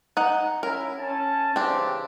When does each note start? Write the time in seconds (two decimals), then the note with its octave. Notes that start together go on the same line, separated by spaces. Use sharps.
0.17 D#4 F#5
0.63 C#4 E4 A#4
0.99 C#4 A5
1.56 C#3 E3 C4 D4 G4